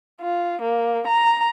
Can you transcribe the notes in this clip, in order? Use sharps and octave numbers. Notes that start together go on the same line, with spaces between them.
F4
A#3
A#5